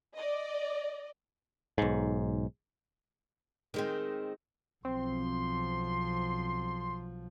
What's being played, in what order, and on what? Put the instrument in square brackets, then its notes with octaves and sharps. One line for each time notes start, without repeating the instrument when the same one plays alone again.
[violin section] D5 D#5
[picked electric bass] B1 G#2
[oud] D#3 G#3 C4
[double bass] B1 F3 [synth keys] C4 [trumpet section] C6